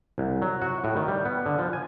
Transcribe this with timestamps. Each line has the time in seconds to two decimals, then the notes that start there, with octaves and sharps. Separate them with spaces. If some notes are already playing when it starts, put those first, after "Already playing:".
0.18 C2
0.42 F#3
0.62 F#4
0.84 A2
0.96 D#3
1.08 G3
1.25 B3
1.46 D3
1.59 F3
1.73 G#5